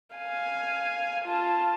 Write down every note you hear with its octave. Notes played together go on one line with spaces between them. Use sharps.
F5 G#5
F4 A5